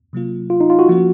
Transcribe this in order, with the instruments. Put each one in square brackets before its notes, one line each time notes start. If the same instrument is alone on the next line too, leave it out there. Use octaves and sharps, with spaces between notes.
[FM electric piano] C3 F#3 A#3 F4
[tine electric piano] F4
D#4
F4
F#4
[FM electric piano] F3 A#3 C#4 F4